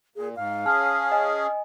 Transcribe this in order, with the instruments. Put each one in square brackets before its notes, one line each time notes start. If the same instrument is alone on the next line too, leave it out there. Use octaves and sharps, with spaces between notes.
[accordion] A#2 [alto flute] G#4
[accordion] G#2 [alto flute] F5
[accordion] C#4 G#4 [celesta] A5 F6
[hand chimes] D#5 G#5